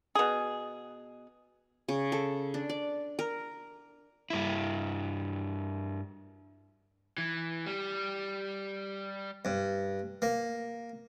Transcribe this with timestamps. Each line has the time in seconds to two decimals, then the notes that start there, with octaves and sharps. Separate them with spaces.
0.15 B2 G#4
1.89 C#3
2.12 A4
2.54 D4
2.69 D5
3.19 A#4
4.30 G2 E4
7.18 E3
7.66 G3
9.45 G2
10.22 A#3